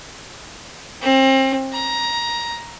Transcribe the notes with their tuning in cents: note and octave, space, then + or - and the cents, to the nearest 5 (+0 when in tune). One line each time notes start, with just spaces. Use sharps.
C4 +30
A#5 +15